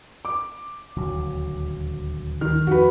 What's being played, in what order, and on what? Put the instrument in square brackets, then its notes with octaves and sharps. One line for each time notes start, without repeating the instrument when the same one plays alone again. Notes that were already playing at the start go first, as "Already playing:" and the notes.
[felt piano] D6
[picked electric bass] D#1 D2 F#3
[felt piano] D#3 F6
[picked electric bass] F2 [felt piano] F#4 B4